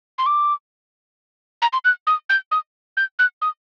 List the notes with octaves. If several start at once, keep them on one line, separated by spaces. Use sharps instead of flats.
C6
D6
A#5
C6
F#6
D#6
G6
D#6
G6
F#6
D#6